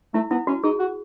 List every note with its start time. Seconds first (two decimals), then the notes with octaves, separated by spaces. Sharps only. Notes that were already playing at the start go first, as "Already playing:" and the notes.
0.14 A3 E4
0.31 B3 E4
0.47 C#4 F#4
0.64 D#4 G#4
0.79 F#4